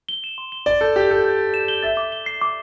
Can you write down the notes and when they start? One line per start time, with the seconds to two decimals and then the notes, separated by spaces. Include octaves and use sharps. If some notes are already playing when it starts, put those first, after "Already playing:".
0.09 G7
0.24 E7
0.38 C6
0.52 G7
0.66 D5 G7
0.81 A4 G6
0.96 G4 G6
1.10 A4 G6
1.25 G6
1.39 G6
1.54 E7
1.68 G7
1.83 E5 A6
1.97 D6
2.12 G7
2.26 C7
2.41 D6